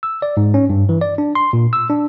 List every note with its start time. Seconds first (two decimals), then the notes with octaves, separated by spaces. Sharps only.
0.03 E6
0.22 D5
0.37 G#2
0.54 C#4
0.70 G2
0.89 E3
1.01 D5
1.18 D4
1.35 C6
1.53 A#2
1.73 E6
1.90 D4